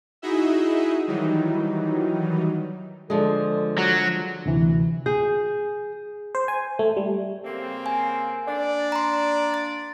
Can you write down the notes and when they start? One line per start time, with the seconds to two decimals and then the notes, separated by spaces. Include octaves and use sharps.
0.22 D#4 E4 F#4 G#4 D#5 E5
1.07 D#3 E3 F#3 G3 D#4
3.10 D3 F3 G#3 A4
3.78 F#3
4.46 D2 C3 E3
5.06 G#4 G6
6.35 C5
6.48 G#5
6.79 A3
6.97 G3
7.44 C#3 A#3 C4
7.86 G#5
8.47 A#3 D4 D5
8.92 A#5 C6
9.54 A6